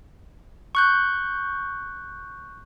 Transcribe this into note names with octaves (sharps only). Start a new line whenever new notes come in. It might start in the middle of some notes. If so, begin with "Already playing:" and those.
C#6 F#6 G6